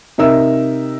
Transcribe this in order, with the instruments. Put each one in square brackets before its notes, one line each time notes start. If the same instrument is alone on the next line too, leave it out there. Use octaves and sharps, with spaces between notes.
[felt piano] C3 D#4 A#4 E5 E6